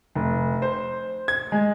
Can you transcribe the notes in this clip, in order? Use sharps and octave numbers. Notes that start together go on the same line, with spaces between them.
F1
C5
G#6
G#3